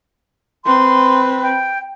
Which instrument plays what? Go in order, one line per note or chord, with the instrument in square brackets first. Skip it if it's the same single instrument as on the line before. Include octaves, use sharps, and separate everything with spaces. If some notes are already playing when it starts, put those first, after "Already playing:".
[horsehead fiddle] C4 B4 [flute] C6
[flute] G5